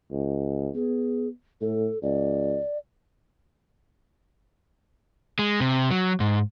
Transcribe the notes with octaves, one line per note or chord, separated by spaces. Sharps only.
C#2
B3 G#4
A2 A4
C#2 D5
G#3
C3
F#3
G#2